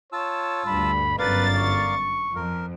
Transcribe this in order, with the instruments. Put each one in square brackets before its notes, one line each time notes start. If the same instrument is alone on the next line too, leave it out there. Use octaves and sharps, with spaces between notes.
[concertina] F4 A5 E6 [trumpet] C#5
[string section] D2 G2 [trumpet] B5
[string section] G1 F#2 A6 [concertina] A#4 D5 F5 [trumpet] B4
[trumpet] C#6
[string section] F2 [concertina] A#4